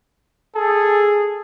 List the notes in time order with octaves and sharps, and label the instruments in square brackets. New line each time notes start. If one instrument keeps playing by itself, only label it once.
[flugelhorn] G#4 [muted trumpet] A4